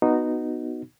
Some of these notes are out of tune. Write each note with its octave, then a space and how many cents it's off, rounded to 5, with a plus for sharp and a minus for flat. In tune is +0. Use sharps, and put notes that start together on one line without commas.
B3 +5 D#4 -10 F#4 +0